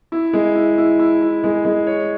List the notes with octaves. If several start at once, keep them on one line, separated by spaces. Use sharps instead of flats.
E4
G#3
E4
E4
E4
E4
G#3
G#3
C#5